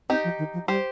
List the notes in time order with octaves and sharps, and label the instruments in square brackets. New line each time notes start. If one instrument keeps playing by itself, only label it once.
[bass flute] C4 [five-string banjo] D#4 G4
[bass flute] F3
D#3
F3
[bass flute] G3 [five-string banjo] G4 C5